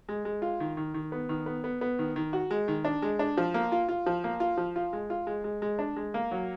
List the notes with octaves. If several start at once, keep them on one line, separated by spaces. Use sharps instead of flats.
G#3
G#3
F4
D#3
D#3
D#3
B3
D#3
B3
B3
B3
D#3
D#3
F#4
G#3
D#3
D4
G#3
D4
F3
A#3
F4
F4
F3
A#3
F4
F3
F4
G#3
F4
G#3
G#3
G#3
D4
G#3
A#3
F#3